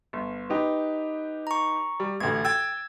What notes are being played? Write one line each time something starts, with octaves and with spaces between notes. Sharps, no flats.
G1
D#4 G4 B4
A#5 C#6
G3
A1 D2 G#6
G5 E6 G#6 A6